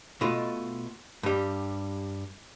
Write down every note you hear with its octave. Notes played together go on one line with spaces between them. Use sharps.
B2 A3 F4 D#5
G2 G3